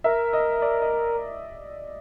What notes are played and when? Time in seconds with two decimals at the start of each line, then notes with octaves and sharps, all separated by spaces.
0.04 A#4 E5
0.33 D#5
0.62 D5
0.82 D#5